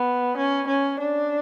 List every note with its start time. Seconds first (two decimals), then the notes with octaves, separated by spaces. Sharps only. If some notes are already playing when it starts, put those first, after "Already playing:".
Already playing: B3
0.38 C#4
0.68 C#4
1.00 D4